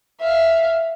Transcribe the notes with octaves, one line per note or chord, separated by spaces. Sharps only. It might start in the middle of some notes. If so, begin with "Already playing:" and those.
E5 F5